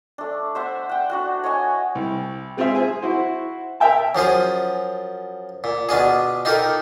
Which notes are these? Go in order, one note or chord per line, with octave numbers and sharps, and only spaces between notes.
A3 D4
C5 E5 F#5
F#5 G5
D4 F#4 F#5
C#5 D#5 F#5 G#5
C2
G#3 C4 F4 G#4 C5 E5
G#4 C5 G#5
E4 F#4 C5
A#4 E5 G5 A5
F#2 F3 F4 G#4
A#2
B2 D4 F4 G#4
D#4 F4 G4 A4 A#4